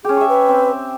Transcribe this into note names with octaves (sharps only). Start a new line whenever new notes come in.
C#4 G4 G#4
E5 C#6
B4
C4